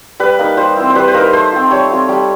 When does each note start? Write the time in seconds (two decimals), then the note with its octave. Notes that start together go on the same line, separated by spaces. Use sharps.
0.20 G3 B4
0.39 A#3 D#4
0.57 G3 C5
0.77 C4 E4
0.90 C5
0.95 G3 B4
1.08 C5
1.14 A#3 D#4 A#4
1.21 B4
1.33 A3 C5
1.52 C4 F4
1.71 G3 C#5
1.90 C4 F4
2.09 G3